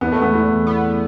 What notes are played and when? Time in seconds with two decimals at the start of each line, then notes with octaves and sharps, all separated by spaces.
0.01 E2 B3
0.12 A3
0.22 B3
0.34 E2
0.67 B3